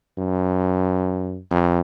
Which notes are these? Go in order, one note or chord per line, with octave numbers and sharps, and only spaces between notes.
F#2
F2